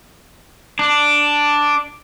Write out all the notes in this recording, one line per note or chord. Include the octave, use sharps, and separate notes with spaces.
D4